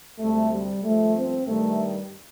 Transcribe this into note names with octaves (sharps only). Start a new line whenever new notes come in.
D2 C3 G3 A3
G3
G2 F3 A3
C4
G2 D#3 G3 A3